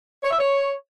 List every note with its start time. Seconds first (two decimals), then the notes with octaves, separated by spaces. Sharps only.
0.23 C#5
0.31 E5
0.39 C#5